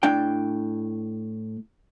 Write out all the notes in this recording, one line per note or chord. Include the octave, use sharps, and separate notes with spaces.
A2 D4 G5